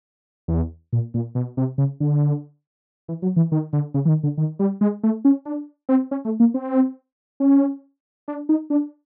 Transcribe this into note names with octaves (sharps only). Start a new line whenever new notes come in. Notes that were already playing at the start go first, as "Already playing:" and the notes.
E2
A#2
A#2
B2
C3
C#3
D3
E3
F#3
E3
D#3
D3
C#3
E3
D#3
D3
D#3
G3
G#3
A3
C#4
D4
C4
C#4
A3
A#3
C4
C#4
D4
D#4
D4